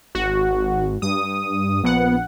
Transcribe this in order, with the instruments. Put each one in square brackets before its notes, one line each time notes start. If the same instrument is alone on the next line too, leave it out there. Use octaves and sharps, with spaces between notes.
[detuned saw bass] G#1 [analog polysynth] F#4
[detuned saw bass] G2 [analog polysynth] D#6
[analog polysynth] A#1 F#5 [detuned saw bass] B3